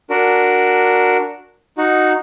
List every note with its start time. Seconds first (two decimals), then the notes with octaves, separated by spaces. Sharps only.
0.10 D4 F#4 A#4
1.78 D#4 F#4